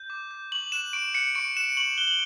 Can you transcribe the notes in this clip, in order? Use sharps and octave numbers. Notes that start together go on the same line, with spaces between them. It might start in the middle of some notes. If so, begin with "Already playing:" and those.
Already playing: G6
D6
G6
C#6 F#7
F#6 E7
C#6 D7
F#6 C#7
C#6 D7
F#6 E7
C#6 F#7
F#6 G7
F#7